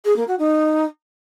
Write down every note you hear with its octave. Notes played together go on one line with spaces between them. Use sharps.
G#4
A#3
F#4
D#4